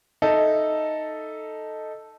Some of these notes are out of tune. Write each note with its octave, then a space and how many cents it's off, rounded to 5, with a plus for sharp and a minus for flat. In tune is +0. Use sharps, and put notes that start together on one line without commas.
D#4 +0 A4 +0 E5 +0